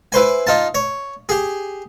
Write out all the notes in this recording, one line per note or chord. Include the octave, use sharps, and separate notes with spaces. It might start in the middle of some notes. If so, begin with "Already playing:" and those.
E4 B4 C5 G#5
D#4 F4 A5
C#5
G4 G#4